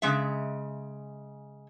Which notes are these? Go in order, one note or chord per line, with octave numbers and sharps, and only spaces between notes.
C#3 G#3 E5